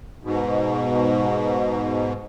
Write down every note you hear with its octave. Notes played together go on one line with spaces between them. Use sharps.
G#2 B2